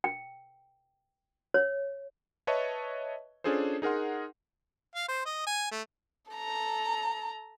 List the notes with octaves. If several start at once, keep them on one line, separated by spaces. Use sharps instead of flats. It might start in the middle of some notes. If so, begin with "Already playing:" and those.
G5
C#5
B4 C#5 D#5 E5 A5 C#6
C#4 D4 F4 G#4 A4 C5
D#4 G#4 A#4 F#5 C6
F5
C5
D#5
G#5
A3
A4 A#5